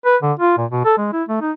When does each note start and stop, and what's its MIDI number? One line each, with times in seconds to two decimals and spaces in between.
0.05 0.16 71
0.22 0.33 50
0.40 0.53 65
0.57 0.66 46
0.71 0.83 47
0.85 0.93 69
0.98 1.11 56
1.13 1.23 64
1.29 1.39 57
1.41 1.52 63